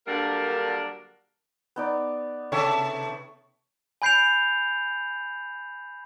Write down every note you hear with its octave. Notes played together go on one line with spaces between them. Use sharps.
D3 F#3 G3 A#3 D4 A#4
B3 D#4 D5
C3 A4 C#5 E5 G5 A5
G#5 B5 G6 C7 D7 F7